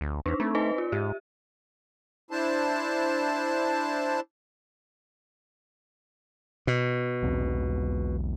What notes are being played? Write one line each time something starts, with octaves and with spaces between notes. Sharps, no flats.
D2
E2 D4 D#4
A3 C4
D#4 B4 D#5
F4
G#2 G4
D4 E4 C5 A5
B2
B1 E2 C4